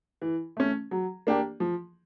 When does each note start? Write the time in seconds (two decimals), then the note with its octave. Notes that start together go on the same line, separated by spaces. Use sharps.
0.22 E3
0.57 A3 C#4
0.91 F#3
1.27 A#3 D4 G4
1.60 F3